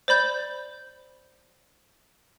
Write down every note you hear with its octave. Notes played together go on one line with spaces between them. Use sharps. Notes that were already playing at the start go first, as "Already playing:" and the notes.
C5 D5 B5 G6